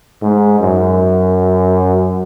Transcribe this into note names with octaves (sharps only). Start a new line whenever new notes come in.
G#2
F#2